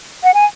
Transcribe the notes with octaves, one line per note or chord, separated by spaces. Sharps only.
F#5
G#5